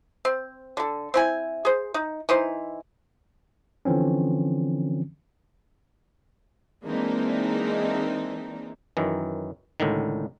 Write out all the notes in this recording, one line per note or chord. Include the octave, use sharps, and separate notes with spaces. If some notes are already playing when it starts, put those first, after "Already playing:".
C4
D3 A4
C4 E4 G#5
G#4 C5
D#4
E3 D#4 C5
D3 E3 F3 C4 C#4
E3 G#3 A#3 C4 D4 D#4
F#2 D#3 E3
C#2 A2 D3 D#3